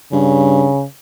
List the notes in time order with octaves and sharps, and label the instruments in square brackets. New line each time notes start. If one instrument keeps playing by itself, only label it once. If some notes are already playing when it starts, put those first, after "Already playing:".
[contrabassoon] G2 [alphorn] C#3